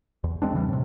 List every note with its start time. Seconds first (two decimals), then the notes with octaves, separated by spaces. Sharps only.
0.24 E2
0.42 E2 G#3 C4 D4
0.53 C#3 E3 G3
0.69 A2 C3